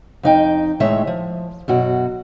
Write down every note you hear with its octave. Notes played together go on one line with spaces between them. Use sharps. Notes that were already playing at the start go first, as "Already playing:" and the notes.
F2 D#4 G5
A2 D#3 G#3 C#5 E5
F3
F#2 B2 F#4